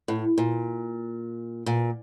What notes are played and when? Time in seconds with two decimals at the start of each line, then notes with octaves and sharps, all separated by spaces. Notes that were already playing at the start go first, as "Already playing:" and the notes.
0.08 A2
0.38 A#2
1.66 A#2